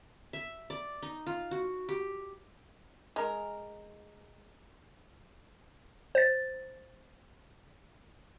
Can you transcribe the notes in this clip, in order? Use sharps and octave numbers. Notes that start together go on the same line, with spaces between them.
E5
D5
D#4
F4
F#4
G4
G#3 A#4
C5 A6